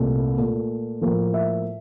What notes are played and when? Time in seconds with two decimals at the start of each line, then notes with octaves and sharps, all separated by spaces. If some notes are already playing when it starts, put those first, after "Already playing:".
Already playing: C2 A#2 A3
0.37 A#2 A3
1.01 A2 F3 A#3
1.34 E5